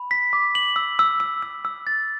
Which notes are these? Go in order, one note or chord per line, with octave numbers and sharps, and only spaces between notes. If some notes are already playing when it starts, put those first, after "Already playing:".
Already playing: B5
B6
D6
F#7
E6
E6
E6
E6
E6
A6